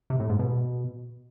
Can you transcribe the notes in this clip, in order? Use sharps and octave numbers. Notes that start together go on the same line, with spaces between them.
C3
A2
G#2
B2